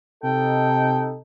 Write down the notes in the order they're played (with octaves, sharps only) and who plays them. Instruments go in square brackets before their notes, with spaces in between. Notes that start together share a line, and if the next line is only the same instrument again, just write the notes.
[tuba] C3 [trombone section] D#4 A4 [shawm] G5